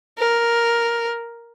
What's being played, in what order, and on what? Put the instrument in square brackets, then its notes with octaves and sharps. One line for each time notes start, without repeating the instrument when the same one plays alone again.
[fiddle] A#4